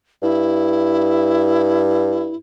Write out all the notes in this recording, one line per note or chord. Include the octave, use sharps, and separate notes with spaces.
G2 E4